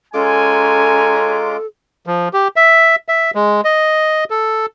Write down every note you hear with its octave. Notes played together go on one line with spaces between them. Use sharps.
G#3 C#4 F4 A4 G#5 A#5 D6
F3
G4
E5
E5
G#3
D#5
A4